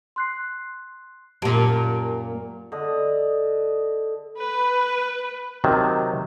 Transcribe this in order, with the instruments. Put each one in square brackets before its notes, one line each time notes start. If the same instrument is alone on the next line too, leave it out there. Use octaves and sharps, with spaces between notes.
[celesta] C6 F#6 C7
[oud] F#2 A#2 [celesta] G4 A5 D7
[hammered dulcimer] D3 D#5
[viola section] B4
[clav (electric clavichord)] C3 D#3 F#3 A5